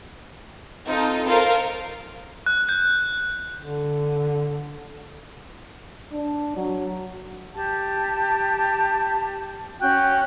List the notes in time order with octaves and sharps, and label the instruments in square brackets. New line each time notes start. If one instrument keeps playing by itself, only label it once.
[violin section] C4 D#4 F4 A4
F4 A4 A#4 C5 F5
[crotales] F#6
G6
[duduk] D3
[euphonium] D4
F#3
[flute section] G4 A5
C#4 F#4 G5 F#6